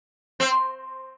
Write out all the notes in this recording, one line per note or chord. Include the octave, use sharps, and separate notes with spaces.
C4